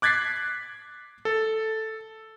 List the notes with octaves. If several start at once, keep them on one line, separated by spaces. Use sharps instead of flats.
D6 F#6 G#6 A6 B6 C7
A4